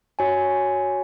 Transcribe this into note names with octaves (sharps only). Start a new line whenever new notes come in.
F#4 C#5 G#5